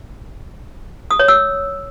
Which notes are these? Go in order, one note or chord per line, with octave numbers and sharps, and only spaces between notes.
D#6
C#5
E6